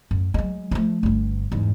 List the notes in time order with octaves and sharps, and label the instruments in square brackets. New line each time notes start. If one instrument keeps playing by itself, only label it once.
[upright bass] F#2
F#3 G#3
F3 A3
G1 G2
E2 G#2